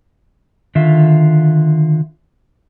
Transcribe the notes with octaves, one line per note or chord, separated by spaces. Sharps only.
D3 D#3 F4 E5